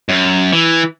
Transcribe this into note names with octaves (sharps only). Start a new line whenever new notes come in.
F#2
E3